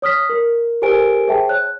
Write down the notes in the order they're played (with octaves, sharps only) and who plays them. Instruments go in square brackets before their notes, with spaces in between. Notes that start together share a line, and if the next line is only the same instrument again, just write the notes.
[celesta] C#5 D#6 F6 B6
A#4
G4 A4 A#4 C5 G#5 D7
G#4 C5 E5 G5 A5
C#5 F#6